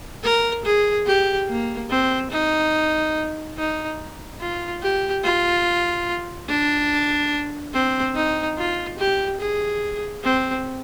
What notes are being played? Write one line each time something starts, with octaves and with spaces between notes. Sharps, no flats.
A#4
G#4
G4
A#3
C4
D#4
D#4
F4
G4
F4
D4
C4
D#4
F4
G4
G#4
C4